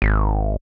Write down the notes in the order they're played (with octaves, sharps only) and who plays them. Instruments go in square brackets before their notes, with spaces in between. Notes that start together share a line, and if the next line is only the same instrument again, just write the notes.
[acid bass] G#1